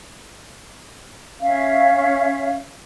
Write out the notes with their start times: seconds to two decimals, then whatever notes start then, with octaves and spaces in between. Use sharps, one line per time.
1.41 C#4 E5 F5